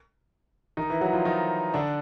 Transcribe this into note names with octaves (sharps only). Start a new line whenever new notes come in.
D#3 D#4
E3 E4
F#3 F#4
F3 F4
D#3 D#4
D3 D4